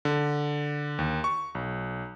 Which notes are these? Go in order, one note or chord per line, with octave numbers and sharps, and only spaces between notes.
D3
D#2
C#6
B1